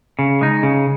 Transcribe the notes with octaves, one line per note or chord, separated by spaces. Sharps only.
C#3
G#3 D#4
C#3